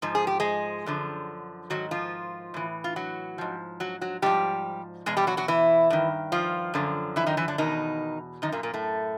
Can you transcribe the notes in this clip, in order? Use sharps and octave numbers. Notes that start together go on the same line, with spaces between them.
G#2 F3
G#4
G4
G#3 G#4
F#2 D3 F3
G#2 D#3 F#3 F#4
F3 F4
A2 E3
F4
F#3 F#4
G#2 F3
F#3 F#4
F#3 F#4
G#2 F3 G3 G4
E2 B2 G#3 G#4
G3 G4
F#3 F#4
F#3 F#4
E3 E4
G2 D#3
F3 F4
F#2 D3 F3
E3 E4
D#3 D#4
E3 E4
D3 D4
E2 B2 D#3 D#4
F#2 D#3 D#4
A#2 A#3
A#2 A#3
A2 A3